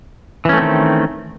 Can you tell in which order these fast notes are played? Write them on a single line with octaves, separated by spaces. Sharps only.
E3 C#4 A3 C4 D#3